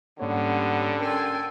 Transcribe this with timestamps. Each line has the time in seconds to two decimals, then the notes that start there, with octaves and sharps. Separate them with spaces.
0.20 G#2 D3 G3 A#3 B3 C#4 C#5
1.01 C#4 A4 A#4 G5 G#5 C6